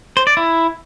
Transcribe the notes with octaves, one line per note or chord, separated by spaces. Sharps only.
C5
D5
E4